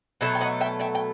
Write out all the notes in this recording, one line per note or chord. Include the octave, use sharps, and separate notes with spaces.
B2 F#3 A3 E5
G5
D#5 F#5
E5 G5
E5 G5
G5